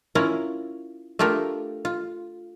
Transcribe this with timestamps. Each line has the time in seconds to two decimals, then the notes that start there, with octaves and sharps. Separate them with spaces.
0.15 C#4 E4 F4 A#4
1.19 A3 D4 F4 G4 A#4
1.85 F4